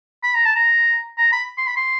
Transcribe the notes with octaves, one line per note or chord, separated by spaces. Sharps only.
B5
A#5
A5
A#5
A#5
B5
C6
B5
C6